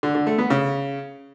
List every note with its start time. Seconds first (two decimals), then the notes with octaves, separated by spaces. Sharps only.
0.03 D3
0.15 D3
0.27 A3
0.38 B3
0.50 C#3